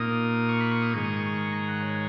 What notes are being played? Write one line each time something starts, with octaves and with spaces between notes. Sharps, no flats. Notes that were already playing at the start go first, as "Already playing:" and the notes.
Already playing: A#2 A#3 D#4 D#6
C#6
B5
C#6
D#6
G#2 D#3 G#3 D#4 C#6
D#6
C#6
C#6
C#6
A#5
F#5
C#5